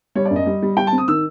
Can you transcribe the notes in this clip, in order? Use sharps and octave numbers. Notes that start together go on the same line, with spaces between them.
G3 C#5
D5
F#2
D#5
G3
G3
G3 G5
A5
C4
D#6
D#3 E6